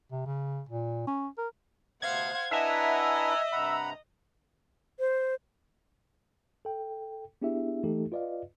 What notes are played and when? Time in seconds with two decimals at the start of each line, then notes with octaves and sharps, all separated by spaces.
0.12 C3
0.26 C#3
0.69 A#2
1.07 C#4
1.38 A#4
2.02 D2 C3 B3 C5 F5 F#5 G#6
2.51 D4 E4 B4 D#5 E5 F#5 G#5 A#5
3.52 G2 C3 F#5 A#5 B5
4.99 C5
6.65 A4 G5
7.42 B3 D4 E4 G4 G#4 E5
7.83 E3 A3 D#4 G4 A4
8.12 F4 B4 D5 D#5 F5